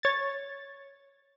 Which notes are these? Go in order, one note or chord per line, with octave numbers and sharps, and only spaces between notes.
C#5 A6